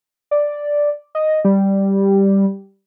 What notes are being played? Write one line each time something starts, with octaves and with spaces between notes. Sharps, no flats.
D5
D#5
G3